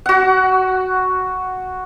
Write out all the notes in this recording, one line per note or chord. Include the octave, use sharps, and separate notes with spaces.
F#4 F#5